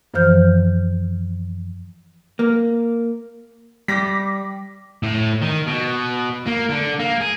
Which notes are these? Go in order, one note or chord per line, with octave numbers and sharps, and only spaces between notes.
F#2 E3 F3 C5 F6 G6
A#3
G3 D6 A#6 B6
A2
D#3
B2
A#3
D3
A#3
G#4